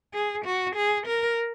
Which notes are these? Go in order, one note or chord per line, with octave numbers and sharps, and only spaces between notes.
G#4
F#4
G#4
A#4